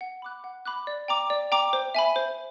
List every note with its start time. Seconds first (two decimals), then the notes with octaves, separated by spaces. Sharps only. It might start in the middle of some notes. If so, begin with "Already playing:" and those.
0.01 F#5
0.22 B5 D6 F#6
0.44 F#5
0.65 B5 D6 F#6
0.87 D5
1.08 G5 A#5 D6
1.30 D5
1.52 G5 A#5 D6
1.73 C5
1.95 E5 G#5 B5
2.16 C5